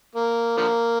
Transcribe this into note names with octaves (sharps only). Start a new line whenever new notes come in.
A#3
D3 F3 A#3